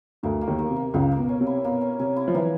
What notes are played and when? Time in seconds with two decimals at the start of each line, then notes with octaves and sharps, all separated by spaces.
0.23 D2 D3 A#3
0.41 A#3
0.47 D#2 D#3
0.59 A#3
0.71 C3
0.76 A#3
0.94 C#2 C#3 A#3
1.11 A#3
1.17 B2
1.29 C#4
1.40 C3
1.47 E4
1.64 B2 A#3
1.81 C#4
1.99 C3 C#4
2.16 E4
2.28 F3
2.35 E3 A#3